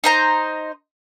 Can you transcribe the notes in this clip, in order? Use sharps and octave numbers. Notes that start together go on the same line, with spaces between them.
D#4 C5 A#5